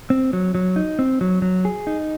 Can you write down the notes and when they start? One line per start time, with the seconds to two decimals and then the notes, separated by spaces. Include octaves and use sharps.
0.10 C4
0.33 F#3
0.55 F#3
0.76 D#4
0.99 C4
1.21 F#3
1.42 F#3
1.65 G#4
1.87 D#4